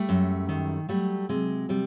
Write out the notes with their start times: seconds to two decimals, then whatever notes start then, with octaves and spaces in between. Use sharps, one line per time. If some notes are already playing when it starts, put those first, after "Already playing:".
Already playing: G3 A3
0.09 F#2
0.49 D#3
0.89 F#3 G3 A3
1.29 C3 G#3
1.69 C3 G3